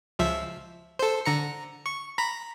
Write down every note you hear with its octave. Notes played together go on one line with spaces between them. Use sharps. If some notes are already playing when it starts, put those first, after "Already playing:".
C#2 F3 E5
A4 C5
D3 A#5 C#7
C#6
A#5 B5